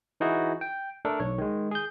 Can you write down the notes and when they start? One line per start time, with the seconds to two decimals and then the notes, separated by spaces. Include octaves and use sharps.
0.20 E3 D#4 E4 F#4 G#4
0.61 G5
1.05 A3 D4 A4 A#4
1.20 B1 C#5
1.38 D#3 G#3
1.71 G#4 G6